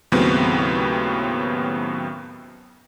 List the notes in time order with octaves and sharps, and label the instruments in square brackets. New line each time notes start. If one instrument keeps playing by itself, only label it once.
[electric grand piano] D#2 A2 C#3 F#3 B3 C4